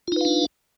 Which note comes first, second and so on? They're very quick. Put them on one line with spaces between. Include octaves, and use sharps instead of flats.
F4 D#4 B4 F5 D4